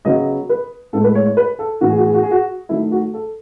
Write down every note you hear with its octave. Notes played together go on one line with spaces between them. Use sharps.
C#3 F#3 B3 D#5
B4
A2 G#3 B3 A4
B4
C#5
C#5
B4
A4
A2 E3 B3 F#4
G#4
F#4
G#4
F#4
G#4
F#4
D#3 F#3 A3 E4
F#4
A4